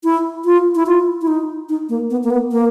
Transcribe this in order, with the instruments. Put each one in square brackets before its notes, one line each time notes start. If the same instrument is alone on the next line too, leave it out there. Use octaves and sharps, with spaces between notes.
[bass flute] E4
F4
E4
F4
E4
D#4
D#4
A#3
B3
A#3
B3
A#3